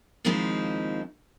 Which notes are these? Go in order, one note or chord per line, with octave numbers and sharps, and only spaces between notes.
D#2 F3 G#3 C4 D#4 E4